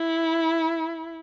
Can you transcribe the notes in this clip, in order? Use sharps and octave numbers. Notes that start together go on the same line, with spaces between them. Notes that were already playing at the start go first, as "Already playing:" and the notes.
Already playing: E4